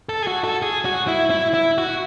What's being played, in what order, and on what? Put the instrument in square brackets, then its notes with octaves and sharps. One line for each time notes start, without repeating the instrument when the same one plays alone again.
[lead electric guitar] A4
G#4
F#4
A4
G#4
F#4
E4
E4
E4
F#4